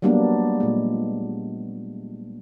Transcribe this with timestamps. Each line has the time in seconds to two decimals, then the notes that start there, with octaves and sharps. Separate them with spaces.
0.02 F#3 G3 A#3 B3 D4
0.60 A#2 G#3